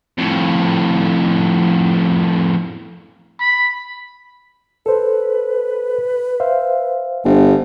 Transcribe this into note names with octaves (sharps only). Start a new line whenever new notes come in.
F2 A2
B5
A4 B4 C5
C5 E5 F5
G1 C5